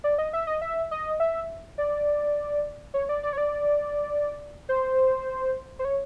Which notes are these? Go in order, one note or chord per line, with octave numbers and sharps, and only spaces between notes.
D5
D#5
E5
D#5
E5
D#5
E5
D5
C#5
D5
D5
C#5
D5
C5
C5
C#5